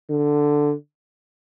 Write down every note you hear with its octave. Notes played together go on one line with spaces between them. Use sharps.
D3